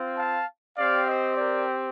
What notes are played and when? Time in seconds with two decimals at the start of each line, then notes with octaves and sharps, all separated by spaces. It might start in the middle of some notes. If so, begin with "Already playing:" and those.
Already playing: C4 F4
0.17 F5 A5
0.77 C4 G4 D5 F5
1.07 C5 D#5
1.37 A#4 D5